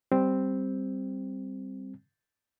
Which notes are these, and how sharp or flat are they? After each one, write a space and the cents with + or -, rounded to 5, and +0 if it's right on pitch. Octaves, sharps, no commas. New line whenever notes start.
G3 +0 C4 +0